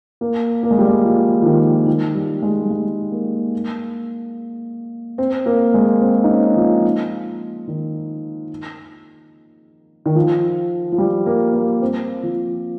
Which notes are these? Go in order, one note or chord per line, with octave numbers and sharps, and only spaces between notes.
A#3
A#3
G#3
G3
G#3
F3
F3
D#3
D#3
G3
G#3
G3
G#3
A#3
C4
A#3
G#3
C4
D#4
C#4
F3
D#3
D#3
F3
F3
G3
A#3
A#3
C4
F3